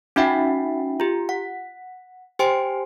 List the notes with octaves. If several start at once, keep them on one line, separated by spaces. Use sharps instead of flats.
C#4 D#4 F#4 E5 F#5 G5
F4 G4
F#5
G4 C5 G5 G#5 C6 D7